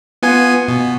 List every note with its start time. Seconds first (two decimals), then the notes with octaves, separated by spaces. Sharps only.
0.23 B3 F4 G#5
0.68 B2